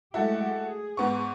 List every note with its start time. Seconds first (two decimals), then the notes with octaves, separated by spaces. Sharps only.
0.14 G#3 A3 E4 F#4 G4 A4
0.61 G#4
0.97 G#2 B3 C#6